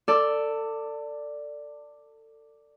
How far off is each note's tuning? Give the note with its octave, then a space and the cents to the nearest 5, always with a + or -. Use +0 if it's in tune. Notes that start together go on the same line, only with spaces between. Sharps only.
A4 +30 D5 +0 E6 +0